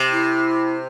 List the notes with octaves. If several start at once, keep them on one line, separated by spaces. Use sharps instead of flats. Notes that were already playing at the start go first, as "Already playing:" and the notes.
Already playing: C3
E4